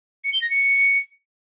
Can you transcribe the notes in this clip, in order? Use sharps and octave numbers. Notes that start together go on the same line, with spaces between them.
C#7
G7
A#6
C#7